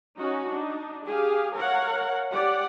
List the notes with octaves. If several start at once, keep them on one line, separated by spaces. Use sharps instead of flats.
C#4 D#4 F#4
D4 D#4
G4 G#4 F5
A#4 C#5 F5 F#5
G4 D5 F#5